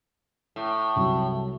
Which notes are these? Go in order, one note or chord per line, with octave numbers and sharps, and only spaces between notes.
A2
C2 F#3 G3